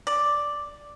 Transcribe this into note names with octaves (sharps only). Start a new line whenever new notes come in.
D5